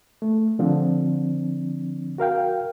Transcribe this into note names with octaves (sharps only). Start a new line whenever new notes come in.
A3
D3 F3 C4 D4
F#4 A#4 F5 G5